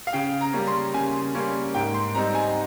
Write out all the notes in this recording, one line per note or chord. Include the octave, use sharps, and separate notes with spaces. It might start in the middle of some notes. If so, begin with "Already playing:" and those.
F5
C#3 G5
A#5
G3 A#3 C#4
C6
C#3 G#5
G3 A#3 C#4
G#2 G5
C6
G3 C4 D#4 A#5
G#5